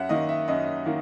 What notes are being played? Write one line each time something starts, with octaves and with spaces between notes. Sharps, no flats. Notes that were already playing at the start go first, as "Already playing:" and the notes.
Already playing: F#2 E5 F#5
D#3 A#3 D#5
E5
F#2 D#5
D#3 A#3